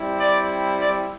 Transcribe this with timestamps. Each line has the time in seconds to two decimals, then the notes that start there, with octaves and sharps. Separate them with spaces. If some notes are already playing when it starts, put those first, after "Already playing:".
Already playing: G3 C4 E4
0.19 D5
0.81 D5